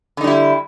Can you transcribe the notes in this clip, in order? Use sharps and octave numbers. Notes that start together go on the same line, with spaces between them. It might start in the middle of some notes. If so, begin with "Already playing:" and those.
D3 G3 D#4 E4